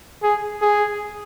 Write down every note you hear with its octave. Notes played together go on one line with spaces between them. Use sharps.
G#4
G#4